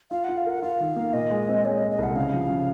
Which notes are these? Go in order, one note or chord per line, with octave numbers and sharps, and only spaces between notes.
F4 F5
F4 F#5
F5
A#4 F#5
F4 F5
D#3
A#3
A#2 D#5
G#3
C4
G#3 C#5
D#5
G#3
D#5
C2 F#5
C#3 F5
F3
C#3